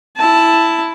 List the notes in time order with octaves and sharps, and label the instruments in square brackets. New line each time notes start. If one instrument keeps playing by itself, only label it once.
[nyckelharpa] E4 A5